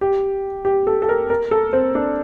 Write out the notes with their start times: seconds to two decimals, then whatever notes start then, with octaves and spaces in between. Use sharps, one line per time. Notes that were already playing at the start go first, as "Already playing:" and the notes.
0.01 G4
0.65 G4
0.87 A4
1.02 A4
1.09 A#4
1.30 A#4
1.51 A4
1.73 C4
1.95 D4